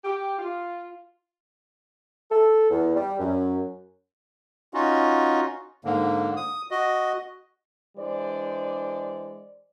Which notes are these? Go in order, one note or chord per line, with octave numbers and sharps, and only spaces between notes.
G4
F4
A4
E2
G3
F#2
C#4 D#4 F4 F#4
G#2 D3 A#3
D#6
F#4 D#5
E3 G#3 D4 C5 D5